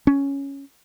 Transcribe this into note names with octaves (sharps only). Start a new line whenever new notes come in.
C#4